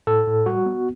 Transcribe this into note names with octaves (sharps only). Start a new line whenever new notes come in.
A2 A4
A2
G3 F#4
B3